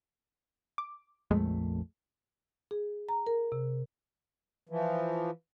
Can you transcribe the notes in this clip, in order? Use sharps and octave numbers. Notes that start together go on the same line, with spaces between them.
D6
A#1 F2 G#3 A3
G#4
A#5
A#4
C3
E3 F3